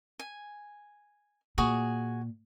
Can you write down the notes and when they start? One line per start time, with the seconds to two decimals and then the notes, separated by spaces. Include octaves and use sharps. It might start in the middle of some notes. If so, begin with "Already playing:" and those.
0.19 G#5
1.58 A#2 F#4 G#4 G#5